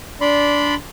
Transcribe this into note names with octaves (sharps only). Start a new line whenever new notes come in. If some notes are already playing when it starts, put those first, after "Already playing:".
D4 D5 B5 C6